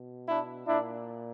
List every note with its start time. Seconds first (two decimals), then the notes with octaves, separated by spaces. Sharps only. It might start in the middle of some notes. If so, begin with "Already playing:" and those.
Already playing: B2
0.28 D4 E4
0.66 A#2 D4 E4